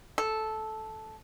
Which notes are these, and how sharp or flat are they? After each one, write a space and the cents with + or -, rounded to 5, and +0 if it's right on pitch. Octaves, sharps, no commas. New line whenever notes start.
A4 -10